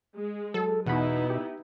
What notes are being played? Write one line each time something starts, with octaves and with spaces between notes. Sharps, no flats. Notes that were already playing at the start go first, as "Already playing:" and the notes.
G#3
F#3 A4
E2 B2 B3 D#4 E4 F#5 B5
G4 E5